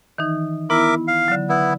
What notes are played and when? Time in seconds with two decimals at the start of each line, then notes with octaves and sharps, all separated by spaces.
0.18 D#3 E3 D#4
0.70 B3 E4 A#4 E5 D6
1.08 F5
1.28 D3 F#3
1.49 B3 E4